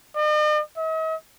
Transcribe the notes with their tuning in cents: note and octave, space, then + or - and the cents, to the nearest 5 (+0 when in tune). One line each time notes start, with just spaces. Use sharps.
D#5 -45
D#5 +45